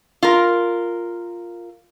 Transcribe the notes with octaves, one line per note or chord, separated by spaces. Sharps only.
F4 A#4